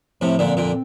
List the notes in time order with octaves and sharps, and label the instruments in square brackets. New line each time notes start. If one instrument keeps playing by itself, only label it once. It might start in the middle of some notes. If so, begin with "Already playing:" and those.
[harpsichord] A2 C3 [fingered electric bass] F3
[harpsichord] A#2 D3
[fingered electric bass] C4
[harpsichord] A#2 D3